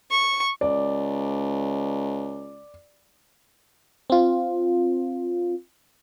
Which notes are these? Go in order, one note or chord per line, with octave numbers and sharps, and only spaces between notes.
C#6
C#2 D5
C4 F4